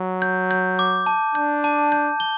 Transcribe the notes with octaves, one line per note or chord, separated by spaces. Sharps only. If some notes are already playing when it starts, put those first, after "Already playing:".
Already playing: F#3
G6
G6
D6
A5
D4 G6
A5
G6
G7